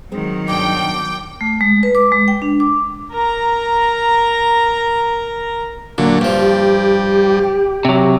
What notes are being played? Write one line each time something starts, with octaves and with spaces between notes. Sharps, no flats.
D#3 F#3 G#3 C4
G2 B2 G5 D6
A3
G#3
B4
D6
G#3
G5
D4
D6
A#4 A#5
A#2 D3 F#3
G2 F3 G3
G4
C3 F#3